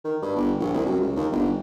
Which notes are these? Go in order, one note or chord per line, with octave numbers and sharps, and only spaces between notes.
D#3
G2
G1
A#1
C2
F#2
C#2
D#2
G1